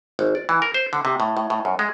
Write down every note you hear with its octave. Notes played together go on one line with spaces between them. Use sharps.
G#1
D5
E3
A#4
C5
D3
C3
A2
A2
A2
F#2
G#3